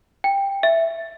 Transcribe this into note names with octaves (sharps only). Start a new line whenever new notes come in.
G5
E5